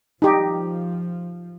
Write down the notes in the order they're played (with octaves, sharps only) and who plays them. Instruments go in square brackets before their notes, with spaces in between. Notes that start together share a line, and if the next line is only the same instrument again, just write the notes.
[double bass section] F3 [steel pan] D#4 G4